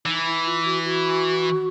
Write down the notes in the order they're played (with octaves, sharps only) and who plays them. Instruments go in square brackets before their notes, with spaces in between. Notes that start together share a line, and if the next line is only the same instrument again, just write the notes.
[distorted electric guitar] E3 [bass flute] D#4
[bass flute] E4
F4
F#4
F#4